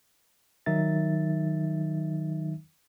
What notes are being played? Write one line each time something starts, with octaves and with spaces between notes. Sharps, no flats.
D#3 F#3 D#4 E5 A6